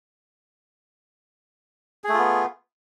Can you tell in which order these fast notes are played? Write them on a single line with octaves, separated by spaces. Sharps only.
G#4 A3 F4 B3